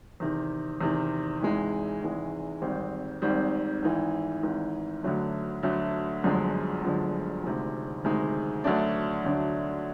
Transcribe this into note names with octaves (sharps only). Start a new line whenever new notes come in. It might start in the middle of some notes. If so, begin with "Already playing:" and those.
E2 C3 D#3
E2 C3 D#3
G#1 G#2 E3 G#3
G#1 G#2 E3 G#3
G#1 G#2 D#3 G3 C4
G#1 G#2 D#3 G3 C4
G#1 G#2 E3
G#1 G#2 E3
D2 D3 F#3 A3
D2 D3 F#3 A3
G1 F#2 D3 F3 G#3
G1 F#2 D3 F3 G#3
D2 C3 D#3 G#3
D2 C3 D#3 G#3
D2 D3 F#3 A3 D4
D2 D3 F#3 A3 D4